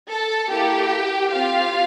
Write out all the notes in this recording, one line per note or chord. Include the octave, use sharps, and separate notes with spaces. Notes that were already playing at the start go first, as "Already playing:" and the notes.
A4 A5
A#3 E4 G4 A4 G5
C4 F4 G4 F5